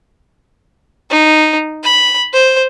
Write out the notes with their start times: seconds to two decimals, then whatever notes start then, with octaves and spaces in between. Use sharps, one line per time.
1.10 D#4
1.83 B5
2.33 C5